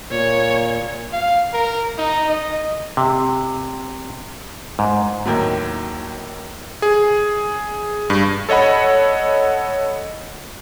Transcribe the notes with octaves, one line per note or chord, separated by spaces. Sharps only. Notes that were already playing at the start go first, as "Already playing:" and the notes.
A#2 C#5
F5
A#4
D#4
D#5
C3
G#2
D#2 A2 F#3
G#4
G2
A4 C#5 D#5 F#5 B5